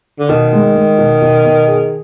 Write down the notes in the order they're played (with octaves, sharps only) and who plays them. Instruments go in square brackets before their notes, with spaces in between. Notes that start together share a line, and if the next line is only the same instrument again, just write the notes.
[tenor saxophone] D3
[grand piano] B2 [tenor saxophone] D#3
[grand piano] G#3
G#3
B2
B2
B2
G#4